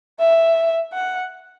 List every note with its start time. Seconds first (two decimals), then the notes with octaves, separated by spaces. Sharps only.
0.20 E5
0.93 F#5